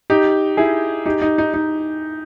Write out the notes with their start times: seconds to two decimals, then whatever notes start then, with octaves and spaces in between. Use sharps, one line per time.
0.10 D#4 G4
0.57 E4 G#4
1.06 D#4 G4
1.22 D#4
1.38 D#4
1.54 D#4